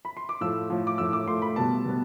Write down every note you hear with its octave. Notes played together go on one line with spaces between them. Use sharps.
B5
C6
D6
A2 F3 A3 E6
A2 F3 A3
D6
A2 F3 A3 E6
D6
A2 F3 A3 C6
B5
B2 G3 B3 A5
B2 G3 B3